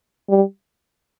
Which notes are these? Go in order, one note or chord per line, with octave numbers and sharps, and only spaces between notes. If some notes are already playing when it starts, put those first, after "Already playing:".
G3